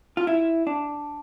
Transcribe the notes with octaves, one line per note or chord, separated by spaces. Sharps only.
F4
E4
D4